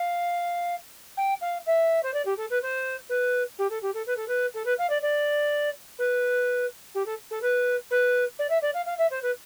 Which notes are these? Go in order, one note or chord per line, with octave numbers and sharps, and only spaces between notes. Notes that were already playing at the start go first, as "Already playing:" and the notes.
Already playing: F5
G5
F5
E5
C5
D5
G4
A4
B4
C5
B4
G4
A4
G4
A4
B4
A4
B4
A4
B4
F5
D5
D5
B4
G4
A4
A4
B4
B4
D5
E5
D5
F5
F5
E5
C5
B4